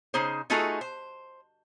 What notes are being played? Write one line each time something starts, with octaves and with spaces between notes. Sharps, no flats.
C#3 D#4 G#4 C5
A3 D#4 F4 F#4 G#4 A4
C5